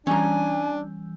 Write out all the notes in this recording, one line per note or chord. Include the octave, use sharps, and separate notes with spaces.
E3 G3 C#4 D4 G#5 A#5